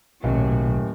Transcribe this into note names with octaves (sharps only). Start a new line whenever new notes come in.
D#1 B1 A2 F#3